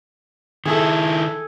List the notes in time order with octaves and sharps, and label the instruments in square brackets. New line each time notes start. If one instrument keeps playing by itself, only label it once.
[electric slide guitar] D#3 E4 [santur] G#4 A4